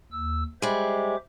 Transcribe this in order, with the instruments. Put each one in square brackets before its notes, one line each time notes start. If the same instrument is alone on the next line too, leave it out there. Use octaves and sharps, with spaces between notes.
[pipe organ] D#2 E6
[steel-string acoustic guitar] G3 G#3 [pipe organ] C5 E5 D6